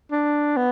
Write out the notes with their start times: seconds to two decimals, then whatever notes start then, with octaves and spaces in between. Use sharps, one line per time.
0.12 D4
0.56 B3